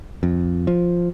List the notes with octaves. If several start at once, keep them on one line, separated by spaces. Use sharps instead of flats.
F2
F3